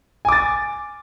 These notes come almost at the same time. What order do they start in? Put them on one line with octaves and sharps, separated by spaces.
G#5 D6 A6